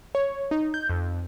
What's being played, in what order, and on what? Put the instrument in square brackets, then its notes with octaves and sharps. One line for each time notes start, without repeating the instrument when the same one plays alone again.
[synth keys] C#5
D#4
G6
F2